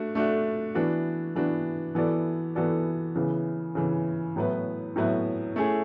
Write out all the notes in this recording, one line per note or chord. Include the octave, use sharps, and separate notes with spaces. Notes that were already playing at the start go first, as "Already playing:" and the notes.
Already playing: A3 D4 F#4
A3 D4 F#4
E3 B3 D4 F#4
E3 B3 D4 F#4
E3 B3 F#4 A4 D5
E3 B3 F#4 A4 D5
C#3 E3 B3
C#3 E3 B3
A2 F#3 B3 E4 B4
A2 F#3 B3 E4 B4
A3 C#4 E4 G#4